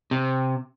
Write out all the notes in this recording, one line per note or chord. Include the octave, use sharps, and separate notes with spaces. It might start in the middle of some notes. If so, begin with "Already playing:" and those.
C3